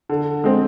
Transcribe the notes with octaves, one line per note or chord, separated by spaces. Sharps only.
D3
G#3 C4